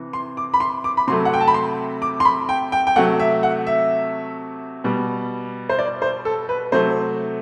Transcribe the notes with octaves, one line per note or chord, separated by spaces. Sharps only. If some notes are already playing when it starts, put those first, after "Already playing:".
Already playing: C3 E3
C6
D6
B5
C6
D6
B5
C3 F#3 A3 C6
F#5
G5
A5
B5
C6
D6
C6
B5
G5
G5
G5
C3 F#3 A3 F#5
E5
F#5
E5
B2 G3
C5
D5
C5
A4
B4
C3 F#3 A3 C5